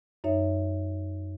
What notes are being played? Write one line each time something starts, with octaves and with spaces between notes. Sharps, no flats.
F#2 D#4 C#5 E5